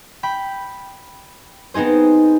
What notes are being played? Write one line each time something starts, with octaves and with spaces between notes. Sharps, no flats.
G5 B5
B3 C4 D#4 G#4 C5